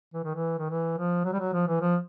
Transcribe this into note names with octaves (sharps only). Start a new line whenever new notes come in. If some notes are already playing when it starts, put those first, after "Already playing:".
E3
D#3
E3
D#3
E3
F3
F#3
G3
F#3
F3
E3
F3